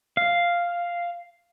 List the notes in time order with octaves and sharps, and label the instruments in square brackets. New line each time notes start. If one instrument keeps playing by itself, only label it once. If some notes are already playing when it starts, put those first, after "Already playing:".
[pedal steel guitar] F5